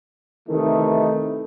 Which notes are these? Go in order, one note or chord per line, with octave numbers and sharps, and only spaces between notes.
C3 D#3 E3 A3 D#4